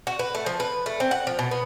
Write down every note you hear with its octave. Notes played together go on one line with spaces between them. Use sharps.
F#4
B4
A3
F3
B4
A3
C4
F#5
F3
B2
B3